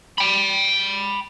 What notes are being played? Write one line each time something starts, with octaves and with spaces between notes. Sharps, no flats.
G5 B5